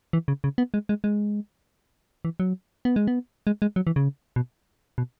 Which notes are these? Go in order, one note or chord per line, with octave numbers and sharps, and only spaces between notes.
E3
C#3
C#3
B3
G#3
G#3
G#3
E3
F#3
B3
G#3
B3
G#3
G#3
F#3
E3
C#3
B2
B2